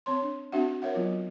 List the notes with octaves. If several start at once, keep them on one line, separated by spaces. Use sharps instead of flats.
C4 C#5 C6
D4
C4 D4 F#4 E5 F#5
A#4 C#5 E5 F#5
F#3 B3 F4